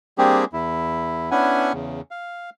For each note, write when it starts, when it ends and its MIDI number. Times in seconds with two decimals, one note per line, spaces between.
0.18 0.45 55
0.18 0.45 58
0.18 0.45 60
0.18 0.45 62
0.18 0.45 67
0.18 0.45 68
0.53 1.30 40
0.53 1.30 64
1.31 1.73 59
1.31 1.73 61
1.31 1.73 62
1.31 1.73 64
1.31 1.73 78
1.31 1.73 80
1.73 2.01 40
1.73 2.01 49
2.11 2.50 77